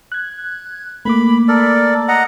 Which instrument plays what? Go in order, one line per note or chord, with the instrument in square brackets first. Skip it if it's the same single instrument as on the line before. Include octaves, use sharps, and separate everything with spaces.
[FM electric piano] F#6 G#6
[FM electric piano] A3 A#3 D6 [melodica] B5
[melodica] A4 A#4 D5
D#5 F#5 A#5